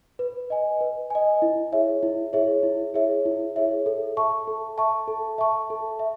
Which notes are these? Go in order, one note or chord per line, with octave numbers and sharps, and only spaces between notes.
B4
D#5 G#5
B4
D#5 G#5
E4
G#4 C#5 E5
E4
G#4 C#5 E5
E4
G#4 C#5 E5
E4
G#4 C#5 E5
A4
E5 A5 C#6
A4
E5 A5 C#6
A4
E5 A5 C#6
A4
E5